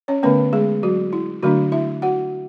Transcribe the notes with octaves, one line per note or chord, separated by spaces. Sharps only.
C#4 C#5
D3 A3 B3 C#4 B4
G#3 G#4
F#3 F#4
E4
D3 F#3 A3 D4 F#4
E4 E5
F#4 F#5